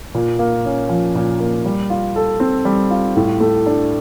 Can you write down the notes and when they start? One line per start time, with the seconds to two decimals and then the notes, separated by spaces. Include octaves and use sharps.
0.15 A#2
0.39 A#3
0.65 C#4
0.89 F3
1.15 A#2
1.40 A#3
1.66 G3
1.90 F4
2.16 A4
2.40 C4
2.65 G3
2.91 F4
3.16 A2
3.40 A3
3.66 D4